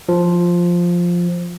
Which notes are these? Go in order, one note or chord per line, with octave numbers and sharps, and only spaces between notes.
F3